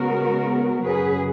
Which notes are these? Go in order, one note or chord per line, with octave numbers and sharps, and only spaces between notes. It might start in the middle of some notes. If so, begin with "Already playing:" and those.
Already playing: C#3 G#3 B3 F#4 A#4
F#2 C#3 F#3 G#4 B4